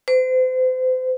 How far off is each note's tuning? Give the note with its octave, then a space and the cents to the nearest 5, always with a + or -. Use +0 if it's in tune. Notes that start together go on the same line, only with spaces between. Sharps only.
C5 -35